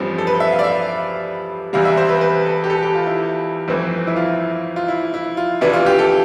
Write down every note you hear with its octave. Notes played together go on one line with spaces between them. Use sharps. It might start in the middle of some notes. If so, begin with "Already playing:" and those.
Already playing: A1 G2 F3 C4
A4
B4
E5
F5
D5
E5
E2 C3 G3 F5
E5
C5
B4
B4
A4
G4
A4
G4
F4
E4
G1 F2 E3 A3 C4
E4
F4
F4
E4
E4
F4
D2 C3 E3 B3 D4 E4
F4
G4
A4